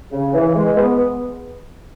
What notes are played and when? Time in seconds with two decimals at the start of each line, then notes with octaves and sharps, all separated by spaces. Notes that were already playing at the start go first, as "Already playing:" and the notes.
0.12 C#3
0.34 E3
0.55 G#3
0.77 B3